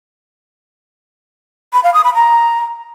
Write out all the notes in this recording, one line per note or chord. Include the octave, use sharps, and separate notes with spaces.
B5
F5
D#6
B5
A#5